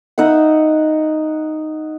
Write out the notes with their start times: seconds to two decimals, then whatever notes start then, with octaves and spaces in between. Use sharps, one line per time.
0.18 D#4 D#5 E5 F#5